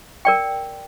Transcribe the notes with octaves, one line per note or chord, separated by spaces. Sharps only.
A#4 D5 G5